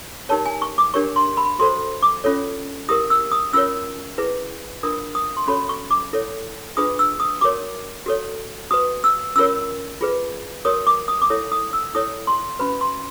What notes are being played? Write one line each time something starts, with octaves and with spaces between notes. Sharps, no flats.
D#4 G4 A#4 C#5 A5
G#5
C#6
D6
D4 G4 A#4 C#5 C#6
C6
B5
F#4 A4 C5 C6
D6
C#4 F4 A4 C#5
E4 G4 A#4 D#6
E6
D#6
C#4 F4 A#4 C#5 E6
E4 G#4 B4
D4 F4 A#4 D#6
D#6
C6
C#4 F#4 A4 C#5 B5
C#6
D6
E4 A4 C#5
D4 F4 G#4 B4 D#6
E6
D#6
F#4 A#4 C#5 D6
F#4 A4 C#5
F#4 B4 D#6
E6
C#4 F4 A#4 C#5 E6
F4 G#4 B4
F#4 A#4 C#5 D#6
D6
D#6
D6
E4 A4 C#5 D#6
D#6
E6
E4 A4 C#5 D#6
C6
C#4 F#4 B4 B5
C6